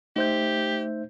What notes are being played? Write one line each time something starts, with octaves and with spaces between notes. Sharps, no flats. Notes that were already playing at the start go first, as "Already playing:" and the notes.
A3 D#4 G4 C5 E5 G6